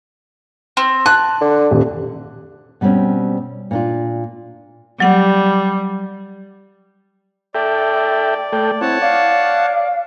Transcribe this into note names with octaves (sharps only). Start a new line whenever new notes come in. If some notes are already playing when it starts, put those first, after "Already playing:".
C4
A5 F#6
D3
D#1
B2 G3 A3 C4 C#4
A#2 D4 F4
F#3 G3 F#5
A4 D5 E5 G5
A3 A4 G5
C4 E4 C#5 F#5 A5
D5 F5